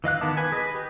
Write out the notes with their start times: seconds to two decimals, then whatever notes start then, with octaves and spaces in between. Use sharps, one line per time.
0.04 E3 D#5 F5 F#6
0.21 D#3 B3 G#4 A5 D6
0.37 B4 G#5
0.52 G#4 B4 D#5
0.75 G4